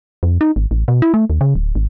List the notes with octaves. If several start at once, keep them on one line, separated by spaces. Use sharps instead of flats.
F2
D#4
G#1
A1
B2
E4
A3
D#2
C#3
D1
G#1